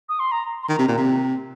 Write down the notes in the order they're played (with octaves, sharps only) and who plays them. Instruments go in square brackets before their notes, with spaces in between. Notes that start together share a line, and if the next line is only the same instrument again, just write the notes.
[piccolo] D#6
C6
A#5
C6
[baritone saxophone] D#3 [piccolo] A#5
[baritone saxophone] C3
A#2
C3